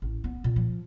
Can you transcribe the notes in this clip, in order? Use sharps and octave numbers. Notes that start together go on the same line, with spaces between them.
A1
B3
A#2
F3